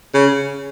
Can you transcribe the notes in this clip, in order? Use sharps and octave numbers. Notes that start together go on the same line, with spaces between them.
C#3